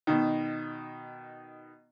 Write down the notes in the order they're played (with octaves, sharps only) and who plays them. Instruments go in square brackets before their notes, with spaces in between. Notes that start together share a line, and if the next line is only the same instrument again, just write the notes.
[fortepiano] B2 D#3